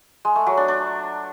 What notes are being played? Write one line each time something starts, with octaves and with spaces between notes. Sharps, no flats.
G#3
A3
F#3
D4
D4